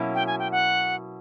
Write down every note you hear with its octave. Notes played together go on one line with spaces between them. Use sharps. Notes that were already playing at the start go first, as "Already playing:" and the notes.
Already playing: B2 F#3 A#3 C#4 E4
G5
G#5
G5
F#5